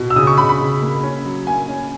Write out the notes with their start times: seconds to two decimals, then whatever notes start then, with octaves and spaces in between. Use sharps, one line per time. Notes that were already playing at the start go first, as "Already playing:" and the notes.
Already playing: B2
0.10 E6
0.16 C#3 D#6
0.27 C#6
0.38 C#3 B5
0.49 B5
0.60 C#3
0.81 A#3
1.03 C#4
1.25 F#3
1.47 A#3 G#5
1.69 C#4